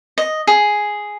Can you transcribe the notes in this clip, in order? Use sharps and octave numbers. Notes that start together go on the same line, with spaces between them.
D#5
G#4